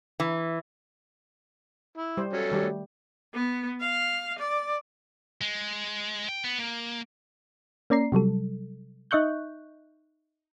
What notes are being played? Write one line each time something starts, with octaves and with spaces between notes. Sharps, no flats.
E3
E4
G3 C5
F#3 C#4 A4
D#3 G3 G4
A3
B3
F5
D5
G#3
G5
B3
A#3
A#3 C#4 D5 A#5 C7
C3 F#3 G3 A4
D#4 D#5 E5 C#6 F#6 G6